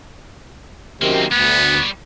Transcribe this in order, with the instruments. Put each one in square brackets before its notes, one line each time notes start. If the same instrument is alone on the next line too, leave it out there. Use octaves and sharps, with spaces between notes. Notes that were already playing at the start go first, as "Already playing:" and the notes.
[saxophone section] F#2 C3 D#3 [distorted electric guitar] A#3 C4
[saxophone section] D2 [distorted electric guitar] G3 C#5 [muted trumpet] B3